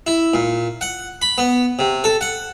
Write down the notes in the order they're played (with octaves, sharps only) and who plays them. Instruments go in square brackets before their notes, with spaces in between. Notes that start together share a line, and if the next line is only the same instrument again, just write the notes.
[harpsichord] E4
A#2
F#5
B5
B3
C3
A4
F#5